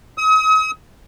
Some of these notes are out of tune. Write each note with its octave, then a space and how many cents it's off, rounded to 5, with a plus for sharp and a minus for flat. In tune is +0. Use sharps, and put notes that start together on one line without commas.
D#6 +40